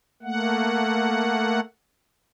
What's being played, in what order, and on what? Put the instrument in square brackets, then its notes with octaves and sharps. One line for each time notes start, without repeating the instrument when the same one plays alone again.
[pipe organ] A3 A#3 F#5